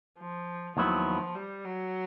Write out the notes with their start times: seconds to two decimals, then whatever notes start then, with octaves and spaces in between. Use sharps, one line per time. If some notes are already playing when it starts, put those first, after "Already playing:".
0.19 F3
0.77 D#2 D#3 F3 F#3 B3 E4
1.35 G3
1.64 F#3